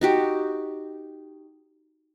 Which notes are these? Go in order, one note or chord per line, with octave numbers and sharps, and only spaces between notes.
D#4 F#4 G4